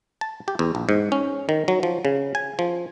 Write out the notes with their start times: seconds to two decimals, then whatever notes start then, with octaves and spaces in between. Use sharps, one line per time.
0.21 A5
0.48 G4
0.59 E2
0.75 A#1
0.89 G#2
1.12 C#4
1.49 D#3
1.68 F#3
1.83 F3
2.05 C#3
2.35 G#5
2.59 F3